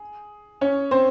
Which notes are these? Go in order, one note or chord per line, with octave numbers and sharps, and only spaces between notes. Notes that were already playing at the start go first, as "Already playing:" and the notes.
Already playing: G#4
C#4 C#5
C4 C5